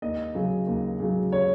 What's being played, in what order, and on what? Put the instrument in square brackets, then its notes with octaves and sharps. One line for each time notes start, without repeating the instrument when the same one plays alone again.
[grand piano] D#2 D#5
C#3 F#3
D#2
C#3 F#3
C#5